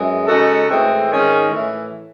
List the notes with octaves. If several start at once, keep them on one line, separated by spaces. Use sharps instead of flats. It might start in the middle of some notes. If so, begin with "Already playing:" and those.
Already playing: F#2 E3 G#3 G#4
C#3 G#3 D#4 F#4 A4
A2 E3 G#3 C4
G#2 D#3 G#3 C#4
A2 E3